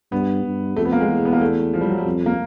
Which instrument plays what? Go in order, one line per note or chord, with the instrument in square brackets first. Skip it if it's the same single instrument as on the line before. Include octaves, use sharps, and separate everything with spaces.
[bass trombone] G2 [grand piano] B3
[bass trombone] G2
[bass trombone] F2 [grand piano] A3
[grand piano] B3
A#3
G#3
[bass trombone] E2
[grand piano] B3
A#3
A3
F3
G3
F#3
G3
[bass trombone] F2
[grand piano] A#3